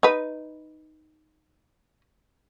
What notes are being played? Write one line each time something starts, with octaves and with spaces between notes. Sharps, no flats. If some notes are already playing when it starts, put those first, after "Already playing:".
D#4 B4